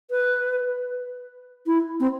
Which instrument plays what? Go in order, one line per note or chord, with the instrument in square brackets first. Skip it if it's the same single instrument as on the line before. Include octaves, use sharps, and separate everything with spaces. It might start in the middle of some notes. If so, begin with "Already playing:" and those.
[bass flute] B4
E4
C4